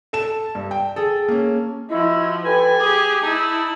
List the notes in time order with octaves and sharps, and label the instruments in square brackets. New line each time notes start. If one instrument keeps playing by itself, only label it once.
[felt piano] A4 A5 E7
G2
G5
[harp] G#4 A4
[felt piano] A#3 C#4
[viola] F3 [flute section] E4 D#5 [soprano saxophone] F#4
[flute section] G4 A4 B4 [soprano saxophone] G#5
[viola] G4 G#4 [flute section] D6
[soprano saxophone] D#4 [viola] E4 [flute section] A5